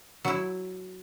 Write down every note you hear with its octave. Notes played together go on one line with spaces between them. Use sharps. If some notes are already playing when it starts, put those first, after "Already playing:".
F#3 E4